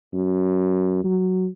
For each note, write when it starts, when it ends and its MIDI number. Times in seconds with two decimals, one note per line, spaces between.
0.13 1.00 42
1.04 1.48 54